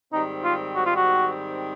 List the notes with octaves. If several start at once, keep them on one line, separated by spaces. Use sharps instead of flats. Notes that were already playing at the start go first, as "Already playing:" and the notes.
G#2 D#3 G3 C4 D#4
F4
F#4
F4
F#4